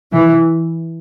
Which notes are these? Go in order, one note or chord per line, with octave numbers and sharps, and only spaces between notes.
E3